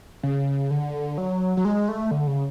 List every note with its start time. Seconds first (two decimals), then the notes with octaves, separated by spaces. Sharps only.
0.23 C#3
0.71 D3
1.18 F#3
1.57 F#3
1.65 G#3
1.89 A3
2.11 D3
2.27 C#3